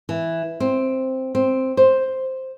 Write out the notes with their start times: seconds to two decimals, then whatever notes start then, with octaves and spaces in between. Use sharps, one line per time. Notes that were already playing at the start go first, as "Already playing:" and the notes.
0.09 E3
0.60 C4
1.35 C4
1.77 C5